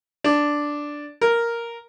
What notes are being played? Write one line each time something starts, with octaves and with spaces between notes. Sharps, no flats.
D4
A#4